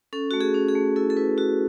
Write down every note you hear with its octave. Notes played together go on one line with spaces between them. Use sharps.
C#4 A4
A3 F#4
G#4
C#4
G#4
A3
E4 A4
A4
E4 B4
E4 F#4